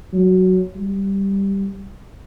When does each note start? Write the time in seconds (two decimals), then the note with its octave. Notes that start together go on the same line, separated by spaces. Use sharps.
0.13 F#3
0.76 G3